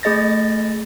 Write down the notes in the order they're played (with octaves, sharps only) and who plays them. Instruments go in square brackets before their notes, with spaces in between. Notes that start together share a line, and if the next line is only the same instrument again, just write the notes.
[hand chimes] A3 G#4 D#5 A6 A#6